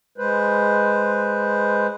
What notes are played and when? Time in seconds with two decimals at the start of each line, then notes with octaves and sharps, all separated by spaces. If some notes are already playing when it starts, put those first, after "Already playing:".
0.18 G#3 B4 C5